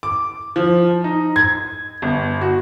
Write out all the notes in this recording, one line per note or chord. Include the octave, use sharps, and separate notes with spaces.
D6
F3
D#4
G#6
G1
F#4